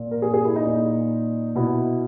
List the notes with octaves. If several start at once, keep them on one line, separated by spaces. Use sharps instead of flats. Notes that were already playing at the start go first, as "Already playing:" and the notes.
Already playing: A#2
A#4
G#4
G#4
E4
D#4
A#2
B2 E4